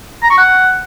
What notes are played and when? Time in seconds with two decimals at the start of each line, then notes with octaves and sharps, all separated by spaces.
0.23 A#5
0.30 C#6
0.37 F#5